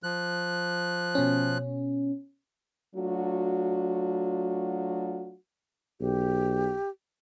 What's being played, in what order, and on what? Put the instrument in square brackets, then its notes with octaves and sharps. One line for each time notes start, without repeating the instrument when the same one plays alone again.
[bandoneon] F3 F#6
[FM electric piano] B2 C#4
[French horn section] F#3 A3 D4 F4 F#4
[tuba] B1 [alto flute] G4